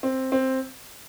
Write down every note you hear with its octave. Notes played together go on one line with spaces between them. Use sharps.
C4
C4